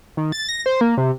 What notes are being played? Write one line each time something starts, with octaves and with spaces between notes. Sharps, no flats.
D#3
A6
A#6
C5
A#3
C3